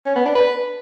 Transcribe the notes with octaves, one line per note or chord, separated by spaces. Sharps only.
C#4
B3
D4
B4